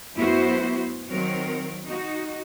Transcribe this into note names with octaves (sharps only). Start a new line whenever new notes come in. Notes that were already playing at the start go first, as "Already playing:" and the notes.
F#2 A3 B3 E4 F#4 C5
D#3 F#3 C4 A#4
D#4 F#4